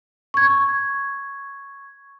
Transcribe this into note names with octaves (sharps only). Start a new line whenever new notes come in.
C#6 G#6